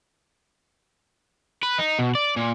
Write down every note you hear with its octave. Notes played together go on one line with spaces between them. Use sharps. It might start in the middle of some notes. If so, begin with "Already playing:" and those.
B4
D#4
B2
D5
A#2